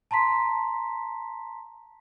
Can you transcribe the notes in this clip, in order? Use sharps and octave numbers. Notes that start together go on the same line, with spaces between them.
A5 A#5 C6 B6